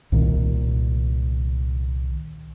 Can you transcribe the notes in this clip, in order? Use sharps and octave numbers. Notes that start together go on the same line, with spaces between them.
C2 A#2 D#3